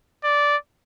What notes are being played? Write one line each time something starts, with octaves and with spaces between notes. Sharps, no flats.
D5